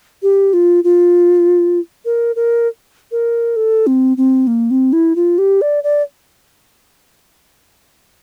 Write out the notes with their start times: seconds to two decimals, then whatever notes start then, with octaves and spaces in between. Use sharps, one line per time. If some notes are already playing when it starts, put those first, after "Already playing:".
0.23 G4
0.53 F4
0.84 F4
2.05 A#4
2.36 A#4
3.12 A#4
3.56 A4
3.87 C4
4.17 C4
4.47 A#3
4.71 C4
4.93 E4
5.16 F4
5.38 G4
5.62 D5
5.84 D5